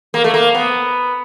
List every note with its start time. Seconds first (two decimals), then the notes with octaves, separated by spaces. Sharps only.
0.14 A#3
0.24 A3
0.34 A#3
0.55 B3